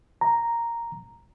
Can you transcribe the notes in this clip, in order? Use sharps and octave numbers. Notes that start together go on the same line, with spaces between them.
A#5